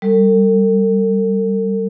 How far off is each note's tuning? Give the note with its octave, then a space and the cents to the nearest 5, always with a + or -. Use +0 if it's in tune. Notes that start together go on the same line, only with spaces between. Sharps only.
G3 -15 A4 +45